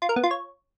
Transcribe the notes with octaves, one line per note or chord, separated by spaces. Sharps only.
F4
A#4
B3
F4
C#5